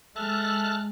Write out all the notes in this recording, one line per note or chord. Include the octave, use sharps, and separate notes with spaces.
G#3 A4 E5 A5 F6 F#6